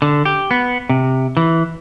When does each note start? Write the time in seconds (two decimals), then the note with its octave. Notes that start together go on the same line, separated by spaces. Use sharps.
0.02 D3
0.25 G4
0.51 B3
0.89 C3
1.37 E3